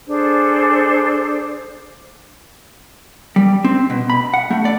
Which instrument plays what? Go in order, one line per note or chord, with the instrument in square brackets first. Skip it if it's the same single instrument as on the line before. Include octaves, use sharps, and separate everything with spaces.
[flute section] D4 G#4 A4 C5
[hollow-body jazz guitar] G3
C4
B2
B5
F#5
A3
D5